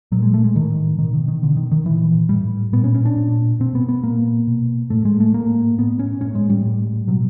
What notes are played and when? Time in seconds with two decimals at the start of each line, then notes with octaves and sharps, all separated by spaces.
0.12 A#2 F#3
0.22 G#3
0.34 A3
0.44 G#3
0.55 A2 D#3
0.99 B2 D#3
1.14 D#3
1.28 D#3
1.43 B2 D3
1.57 D#3
1.71 D#3
1.86 A#2 E3
2.29 A2 G3
2.73 A#2 B3
2.84 C#4
2.95 C#4
3.05 D4
3.17 A#2
3.60 B2 C4
3.75 B3
3.89 B3
4.04 A#2 A#3
4.47 B2
4.90 A2 A3
5.05 G#3
5.20 A3
5.34 A2 A#3
5.78 A2 B3
5.99 C#4
6.21 A2 C#4
6.35 G#3
6.50 G3
6.65 A2
7.08 B2 F#3